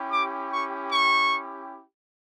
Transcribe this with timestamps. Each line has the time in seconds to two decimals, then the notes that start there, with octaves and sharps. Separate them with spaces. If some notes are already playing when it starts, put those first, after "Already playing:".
Already playing: C#4 E4 G4
0.12 D6
0.51 C#6
0.90 C#6